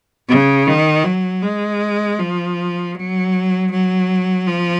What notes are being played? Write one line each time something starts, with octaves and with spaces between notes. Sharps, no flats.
C#3
D#3
F#3
G#3
F3
F#3
F#3
F3